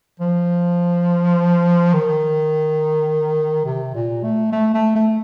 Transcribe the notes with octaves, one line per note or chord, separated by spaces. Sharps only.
F3
D#3
C3
A#2
A3
A3
A3
A3